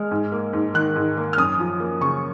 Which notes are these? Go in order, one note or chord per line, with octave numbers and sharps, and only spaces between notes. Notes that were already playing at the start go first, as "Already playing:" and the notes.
Already playing: G#3 F6
G#2
A#3
G#2
D#3 F#6
G#2
A#3
F6
F#2 D#6
F3
A#3
C#3 C#6